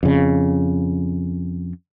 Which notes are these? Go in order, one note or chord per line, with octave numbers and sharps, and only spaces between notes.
F2 C#3